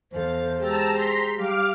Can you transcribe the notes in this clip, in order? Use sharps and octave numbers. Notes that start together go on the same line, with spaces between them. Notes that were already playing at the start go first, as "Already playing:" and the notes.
E2 A4 C5 F5
G#3 G4 G#4 A5 A#5 E6
A#5 C6 B6
G3 G4 F5 D6 F6